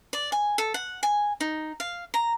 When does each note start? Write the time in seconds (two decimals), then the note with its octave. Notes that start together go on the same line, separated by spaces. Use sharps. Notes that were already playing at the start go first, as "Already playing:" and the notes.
0.13 D5
0.32 G#5
0.58 A4
0.74 F#5
1.03 G#5
1.40 D#4
1.80 F5
2.14 A#5